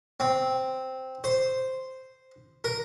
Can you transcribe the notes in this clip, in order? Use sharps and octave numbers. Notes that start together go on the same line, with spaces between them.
C4
C5
A#4